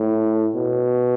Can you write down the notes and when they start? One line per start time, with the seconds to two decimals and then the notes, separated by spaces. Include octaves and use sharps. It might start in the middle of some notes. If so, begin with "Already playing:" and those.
Already playing: A2
0.55 B2